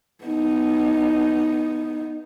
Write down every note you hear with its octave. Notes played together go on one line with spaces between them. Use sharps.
B3 D#4